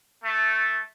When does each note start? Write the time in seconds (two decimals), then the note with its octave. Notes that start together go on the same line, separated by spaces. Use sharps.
0.23 A3